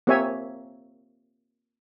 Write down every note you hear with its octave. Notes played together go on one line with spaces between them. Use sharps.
A#3 C4 G4 C#5 E5 G#5